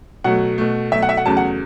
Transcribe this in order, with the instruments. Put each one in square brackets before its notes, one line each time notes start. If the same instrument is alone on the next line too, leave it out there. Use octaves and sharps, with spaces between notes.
[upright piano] B2 F#3 A3 F#5
B2 A3
B2 F#3 A3 E5
F#5
E5
F#5
E2 C#3 F#3 A3 A5
F#5